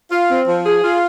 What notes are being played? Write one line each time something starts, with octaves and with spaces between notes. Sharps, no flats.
F4
C4
F3
G#4
F4